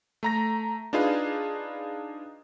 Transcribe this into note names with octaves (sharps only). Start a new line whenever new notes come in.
A3 A#5 A#6
D4 D#4 F4 G#4 B4 F5